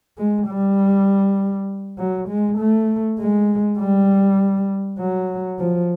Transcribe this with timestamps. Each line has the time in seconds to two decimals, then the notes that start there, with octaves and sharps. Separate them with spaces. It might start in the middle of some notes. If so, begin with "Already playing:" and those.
0.18 G#3
0.48 G3
1.98 F#3
2.28 G#3
2.58 A3
3.18 G#3
3.79 G3
4.99 F#3
5.59 F3